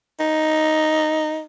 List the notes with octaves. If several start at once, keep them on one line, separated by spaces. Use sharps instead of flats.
D#4